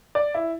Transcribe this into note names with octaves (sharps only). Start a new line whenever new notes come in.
D5
E4